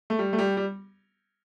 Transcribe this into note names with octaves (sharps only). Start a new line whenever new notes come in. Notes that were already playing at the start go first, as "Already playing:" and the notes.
A3
G3
A3
G3
G3